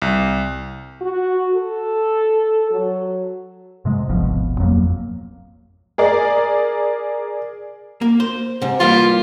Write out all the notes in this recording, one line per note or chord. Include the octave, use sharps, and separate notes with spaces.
C2
F#4
A4
F#3
G#2 C3 G#3
D1 G#1 B2 F3
F2 F#3 A3 A#3
G#4 A#4 D5
A#3
C5
G#2 C3
E3 G3 A#3 F4